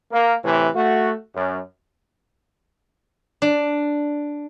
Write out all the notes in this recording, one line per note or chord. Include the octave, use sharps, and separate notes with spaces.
A#3
A2 C3 E3
A3 F#4
F#2
D4